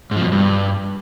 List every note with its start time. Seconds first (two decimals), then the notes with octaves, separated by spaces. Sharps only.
0.11 G#2
0.16 F3
0.21 B2
0.26 F2
0.32 G2